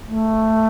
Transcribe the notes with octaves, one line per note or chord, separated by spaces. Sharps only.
A3